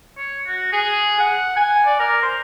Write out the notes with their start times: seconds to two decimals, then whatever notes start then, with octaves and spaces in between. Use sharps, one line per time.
0.17 C#5
0.47 F#4
0.72 G#4
1.19 F#5
1.56 G#5
1.86 D5
1.99 A#4
2.22 C5